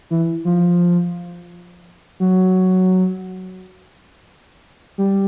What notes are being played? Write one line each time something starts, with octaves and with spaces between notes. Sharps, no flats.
E3
F3
F#3
G3